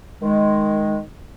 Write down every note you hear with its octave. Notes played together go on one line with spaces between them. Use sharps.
D#3 G#3